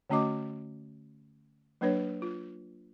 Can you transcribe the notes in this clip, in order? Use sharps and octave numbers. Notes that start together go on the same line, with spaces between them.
D3 A3 C#4 F#4 D#5 D6
F#3 A#3 D4 B4 C#5
F4